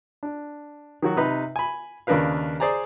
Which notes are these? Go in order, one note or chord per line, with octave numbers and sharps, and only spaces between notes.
D4
D#3 F#3 F#4
C3 D#4 B4 B5
G#5 B5
D#2 C#3 D4 A#4 B4 F5
G#4 C5 D5 G#5 A#5